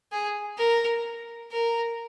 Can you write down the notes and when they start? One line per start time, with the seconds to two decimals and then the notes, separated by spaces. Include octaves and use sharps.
0.12 G#4
0.58 A#4
1.52 A#4